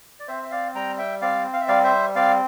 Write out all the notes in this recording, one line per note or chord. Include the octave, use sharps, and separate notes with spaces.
D5
C4 C5 E5
E5
D5 F5
G3 G5 A#5
E5 G5
C4 D5 F5
F5
E5
G3 D5 F5
C5 E5
C4 D5 F5